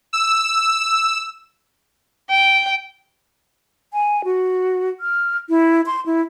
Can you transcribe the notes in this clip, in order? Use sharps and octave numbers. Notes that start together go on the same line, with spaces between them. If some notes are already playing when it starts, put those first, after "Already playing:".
E6
G5
G#5
F#4
F6
E4
C6
E4